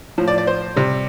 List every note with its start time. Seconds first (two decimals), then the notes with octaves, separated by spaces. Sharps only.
0.18 A2 F3
0.28 D5
0.38 D5
0.47 C5
0.76 C3 G3